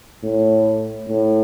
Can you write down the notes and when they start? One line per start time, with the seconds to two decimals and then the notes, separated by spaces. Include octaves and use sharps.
0.23 A2
1.08 A2